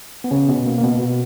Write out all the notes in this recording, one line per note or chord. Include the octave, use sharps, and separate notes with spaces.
B3
C#3 C#4
B2 B3
A#3
A#3
B2 B3
B2 B3